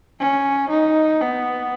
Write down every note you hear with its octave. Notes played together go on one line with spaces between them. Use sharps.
C#4
D#4
B3